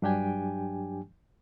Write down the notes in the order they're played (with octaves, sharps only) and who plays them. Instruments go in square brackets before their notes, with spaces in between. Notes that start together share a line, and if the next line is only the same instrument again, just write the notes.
[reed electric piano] G2 F#3 D4 G4 G5 G#5